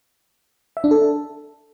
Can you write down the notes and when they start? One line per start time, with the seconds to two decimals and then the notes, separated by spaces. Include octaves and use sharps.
0.77 E5
0.84 D4
0.91 A4